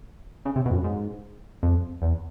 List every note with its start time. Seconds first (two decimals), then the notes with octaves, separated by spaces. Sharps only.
0.45 C#3
0.56 C3
0.66 B2
0.70 F2
0.75 F#2
0.84 G#2
1.63 F2
2.02 E2